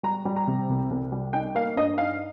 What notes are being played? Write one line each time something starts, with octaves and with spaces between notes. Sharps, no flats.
G3 A#5
G3
A#5
C3
C2
C2
G3
D#4 G5
A#3 F5
G2 D#5
D#4 F5